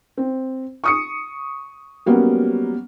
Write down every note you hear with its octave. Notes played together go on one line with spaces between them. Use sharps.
C4
C#6 D#6 C#7
F#3 G3 A#3 B3 C#4